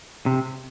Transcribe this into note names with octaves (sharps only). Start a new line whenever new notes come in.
C3